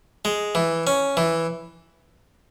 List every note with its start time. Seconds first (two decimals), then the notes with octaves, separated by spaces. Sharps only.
0.25 G#3
0.55 E3
0.87 C#4
1.17 E3